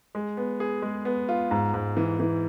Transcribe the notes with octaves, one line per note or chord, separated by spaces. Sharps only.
G#3
B3
G#4
G#3
B3
F4
G#2
G#2
E3
E3